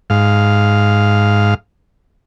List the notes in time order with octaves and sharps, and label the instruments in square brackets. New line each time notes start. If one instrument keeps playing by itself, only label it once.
[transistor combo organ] G#2 F5